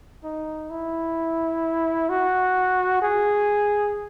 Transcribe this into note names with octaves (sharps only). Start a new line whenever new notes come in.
D#4
E4
F#4
G#4